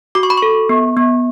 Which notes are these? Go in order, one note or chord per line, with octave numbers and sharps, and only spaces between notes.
F#4 D6
C#6
B5
C#6
A4
B3
B3